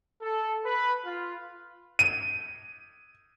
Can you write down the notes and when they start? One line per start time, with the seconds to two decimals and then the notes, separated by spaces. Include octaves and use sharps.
0.22 A4
0.65 B4
1.05 F4
1.99 D#7